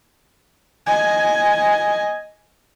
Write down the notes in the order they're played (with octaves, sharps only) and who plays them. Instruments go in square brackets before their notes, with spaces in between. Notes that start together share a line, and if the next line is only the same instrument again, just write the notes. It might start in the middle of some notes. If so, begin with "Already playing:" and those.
[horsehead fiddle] D#5 G#5